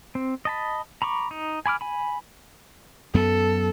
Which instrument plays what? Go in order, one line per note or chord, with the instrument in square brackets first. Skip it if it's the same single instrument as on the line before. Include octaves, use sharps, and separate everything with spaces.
[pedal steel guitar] C4
D#5 A5 B5
A#5 B5 C#6 D6
D#4
G#5 B5 D6 F6
G#5 B5
[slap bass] F#2 B3 [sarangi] A4